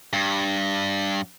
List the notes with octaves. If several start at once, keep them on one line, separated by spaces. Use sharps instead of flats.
G2